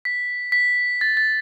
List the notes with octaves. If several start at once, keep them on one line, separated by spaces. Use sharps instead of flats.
B6
B6
A6
A6